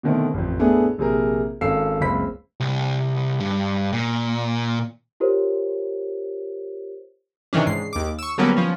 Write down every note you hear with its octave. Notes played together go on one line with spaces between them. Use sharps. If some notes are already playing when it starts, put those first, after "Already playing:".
B2 D3 D#3 A3 C4 D#4
A1 F2
A2 A3 B3 D4 G#4 A4
A#1 C3 G#4 A#4
G#1 C#4 A4 F5 E6 C7
F#1 C#2 C4 B5 B6
C2
G2
A#2
F4 G4 A#4 C5 C#5
C3 D#3 E3 C#4 D4
G#2 C7
D#2 D6
C#6 E6
D3 F#3 G3 A#3 B3 C#4
F3 C#4